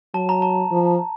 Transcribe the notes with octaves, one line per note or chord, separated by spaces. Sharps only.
F#3 A5
A#5
A5
F3